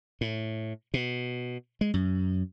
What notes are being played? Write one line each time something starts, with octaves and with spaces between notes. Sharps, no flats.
A2
B2
G#3
F#2